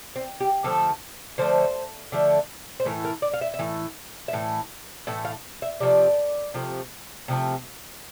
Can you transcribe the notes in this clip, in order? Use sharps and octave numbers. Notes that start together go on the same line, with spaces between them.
C4
G4
D3 F3 A3 A4
D3 F3 A3 C5
D3 F3 A3
C5
A2 E3 A3 A#4
A#4
D5
F5
E5
E5
A2 E3
E5
A2 E3
A2 E3 A3 E5
F5
E5
C3 F3 A3 D5
C3 F3 A3
C3 F3 A3